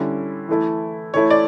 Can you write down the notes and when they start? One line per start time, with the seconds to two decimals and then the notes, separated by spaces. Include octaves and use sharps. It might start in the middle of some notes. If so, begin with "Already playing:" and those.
Already playing: D3 G3 C#4 E4
0.49 E3 A3 E4
1.14 E3 A3 E4 C#5
1.30 D5